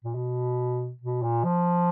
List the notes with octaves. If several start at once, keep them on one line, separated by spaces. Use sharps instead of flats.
A#2
B2
B2
A#2
F3